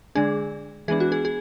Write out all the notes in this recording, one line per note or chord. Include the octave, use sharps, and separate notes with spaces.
D3 G#3 D4 G#4
E3 G#3 B3 D4 G#4
F#4
G#4
G#4